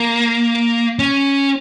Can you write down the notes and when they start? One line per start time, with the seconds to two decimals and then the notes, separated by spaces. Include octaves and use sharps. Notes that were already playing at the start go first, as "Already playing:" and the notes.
Already playing: A#3
0.99 C#4